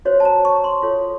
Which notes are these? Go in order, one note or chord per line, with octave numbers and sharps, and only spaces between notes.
F#4 C5 C#5
A5
A#5
C#6
C6
F4 A4 C#5